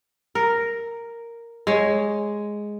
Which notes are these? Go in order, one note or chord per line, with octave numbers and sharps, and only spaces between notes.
A#4
G#3 C#5